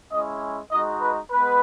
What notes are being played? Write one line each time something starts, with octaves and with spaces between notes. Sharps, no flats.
G#3 C#4 E4 D#5
G#3 D#4 F#4 D#5
B4
G#3 B3 B4